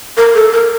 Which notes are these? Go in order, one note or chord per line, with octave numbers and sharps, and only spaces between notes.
A#4
A4
A#4